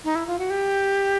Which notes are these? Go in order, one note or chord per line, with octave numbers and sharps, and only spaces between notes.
D#4
E4
F4
F#4
G4